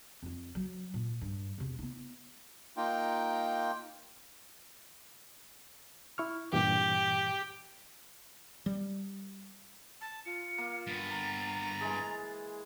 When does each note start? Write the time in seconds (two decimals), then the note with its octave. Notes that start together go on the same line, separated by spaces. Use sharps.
0.22 F2 F4
0.55 F#3
0.94 A#2 F4
1.21 G2
1.58 E1 C3
1.79 B3 E4
2.77 A#3 D#4 F4 G5
6.18 E4 C#6 F6
6.53 G2 A#2 E3 G4
8.66 G3
10.01 A5
10.26 F4 C#7
10.58 A#3
10.87 G2 B3 A6
11.09 A#5
11.81 E3 G#3 G#4